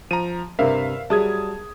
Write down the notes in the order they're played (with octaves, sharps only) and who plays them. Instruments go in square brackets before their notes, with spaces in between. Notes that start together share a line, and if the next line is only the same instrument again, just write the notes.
[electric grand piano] F3 A#5 [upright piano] D#7
[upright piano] G2 C3 [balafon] A#4 C5 [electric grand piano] E5 F5
[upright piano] F#3 G3 [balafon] G#4 E5 [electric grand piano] A5 D#6 G#6